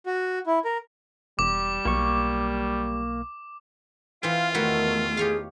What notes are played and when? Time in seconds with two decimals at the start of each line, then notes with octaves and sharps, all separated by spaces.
0.06 F#4
0.47 E4
0.65 A#4
1.39 E1 G3 D6
1.85 B1 A#3 C#6
4.23 E3 C4 F4 F5
4.55 E2 D#3 A3 E4 F#4 A#4 C#5
5.17 G4 G#4 C#5 F5